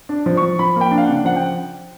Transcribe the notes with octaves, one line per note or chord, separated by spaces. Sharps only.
D4
F3
F3 C#6
F3 B5
A#3 G5
D4
F5
F#5
C#3
F3 F#5
G5